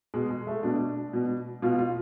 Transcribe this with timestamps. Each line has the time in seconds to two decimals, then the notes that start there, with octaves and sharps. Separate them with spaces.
0.14 B2 G#3
0.30 G#3
0.47 A3
0.63 B2 D4
1.13 B2
1.62 B2 F4
1.79 F4